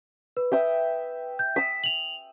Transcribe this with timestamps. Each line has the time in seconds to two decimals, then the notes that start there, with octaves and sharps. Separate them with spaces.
0.37 B4
0.52 E5 G5 D#6
1.39 G6
1.56 D#6 E6 B6
1.84 F7 F#7